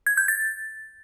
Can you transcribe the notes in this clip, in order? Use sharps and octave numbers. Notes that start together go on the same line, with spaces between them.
G#6
G6
A6